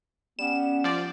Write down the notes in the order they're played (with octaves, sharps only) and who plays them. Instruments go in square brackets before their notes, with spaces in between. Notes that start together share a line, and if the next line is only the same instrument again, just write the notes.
[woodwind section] G3 B3 C#4 [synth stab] E7
[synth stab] F3 D5